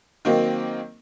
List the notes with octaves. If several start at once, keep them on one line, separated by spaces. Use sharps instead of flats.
D#3 F#3 A#3 C4